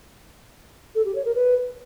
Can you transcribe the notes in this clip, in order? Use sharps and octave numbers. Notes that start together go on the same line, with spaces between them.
A4
G4
C#5
A#4
B4